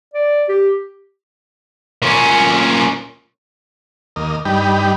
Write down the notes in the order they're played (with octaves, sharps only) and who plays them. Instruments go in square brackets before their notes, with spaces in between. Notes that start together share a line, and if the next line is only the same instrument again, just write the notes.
[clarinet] D5
G4
[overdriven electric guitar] A#2 C#4
[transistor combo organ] D#2 A#3 D#5
G2 G3 D#4 G5 B5